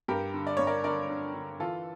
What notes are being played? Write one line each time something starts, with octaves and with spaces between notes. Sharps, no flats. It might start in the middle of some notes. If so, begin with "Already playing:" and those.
G2 G4 A#4
D3
D5
G2 C#5
A#4 D5
D3 A#4 D5
D3
D3
E3 F4 A4